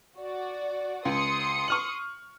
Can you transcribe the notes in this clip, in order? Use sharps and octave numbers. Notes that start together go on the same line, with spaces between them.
F#4 D5
C#2 C6 D#6 C#7
C#6 F6 F#7